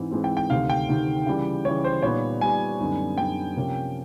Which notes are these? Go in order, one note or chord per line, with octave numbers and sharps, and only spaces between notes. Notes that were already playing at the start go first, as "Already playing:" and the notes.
Already playing: G#2 E3 G#3 C4
G#2 E3 G#3 C4
G5
G5
D2 C3 D#3 F5
G5
D2 C3 D#3
C#3 E3 G3
C#3 E3 G3 C#5
C5
A#2 G3 B3 D#4 C#5
A#2 G3 B3 D#4 G#5
F#2 D3 G3 B3 D#4
F#2 D3 G3 B3 D#4 G5
C3 F3 A#3 C#4